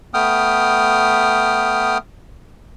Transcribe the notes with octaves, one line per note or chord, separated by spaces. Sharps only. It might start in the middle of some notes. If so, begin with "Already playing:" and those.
A3 B3 G5 D#6 F6